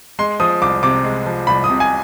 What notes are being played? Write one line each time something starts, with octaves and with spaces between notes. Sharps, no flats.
G#3 C6
F3 D#6
C2 D6
C3 D6
G#3
F3
C2 B5
D#6
C3
G#5